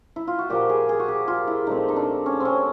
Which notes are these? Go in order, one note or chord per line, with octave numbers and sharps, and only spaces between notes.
E4
F4
F#4
A#2 F3 A#3 G4
G#4
G#4
F#4
G4
F4
E4
A#2 F3 A3 C4 D#4
D#4
D4
C#4
C4 C#4